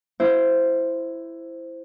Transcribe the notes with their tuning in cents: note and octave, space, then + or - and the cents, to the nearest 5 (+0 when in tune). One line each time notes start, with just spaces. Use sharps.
E4 +10 C5 -5